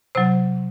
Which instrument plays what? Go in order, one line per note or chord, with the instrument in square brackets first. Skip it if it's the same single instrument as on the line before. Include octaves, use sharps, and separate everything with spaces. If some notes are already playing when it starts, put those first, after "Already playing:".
[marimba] C3 F#3 C5